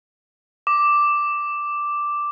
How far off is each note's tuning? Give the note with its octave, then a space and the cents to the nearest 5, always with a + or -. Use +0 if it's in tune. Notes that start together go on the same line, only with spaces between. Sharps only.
D6 +0